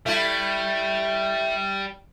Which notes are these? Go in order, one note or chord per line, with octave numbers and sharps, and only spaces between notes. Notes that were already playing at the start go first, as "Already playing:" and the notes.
G3 A3 E4